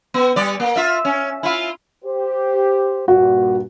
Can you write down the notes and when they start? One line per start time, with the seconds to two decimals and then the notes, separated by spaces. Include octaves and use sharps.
0.14 B3
0.36 G3 D5
0.60 A#3
0.76 F4 E5
1.05 C#4
1.43 E4 F4
2.04 G4 C5
3.08 G2 A#2 F#4